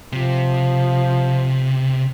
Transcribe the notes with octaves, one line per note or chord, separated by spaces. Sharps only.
C3 F3